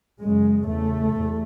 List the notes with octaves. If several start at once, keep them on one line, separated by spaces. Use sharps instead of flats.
F#2 C#3 G#3
E2 C#3 A3
E2 C3